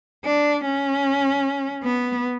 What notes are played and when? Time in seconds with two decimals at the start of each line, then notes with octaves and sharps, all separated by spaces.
0.25 D4
0.64 C#4
1.83 B3